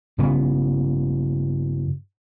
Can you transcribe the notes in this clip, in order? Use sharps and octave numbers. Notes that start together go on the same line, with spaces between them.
G2 C#3 B3